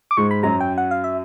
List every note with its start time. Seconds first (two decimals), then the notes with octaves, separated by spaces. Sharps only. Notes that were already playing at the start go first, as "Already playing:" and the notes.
0.11 D6
0.17 G#2 G#3 C#6
0.31 B5
0.43 F#2 F#3 A#5
0.61 G5
0.78 F#5
0.91 F5
1.04 E5